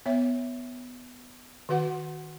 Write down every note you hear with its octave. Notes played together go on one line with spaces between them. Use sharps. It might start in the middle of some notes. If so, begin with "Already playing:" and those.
B3 C#5 E5
D#3 F#4 B4 F#5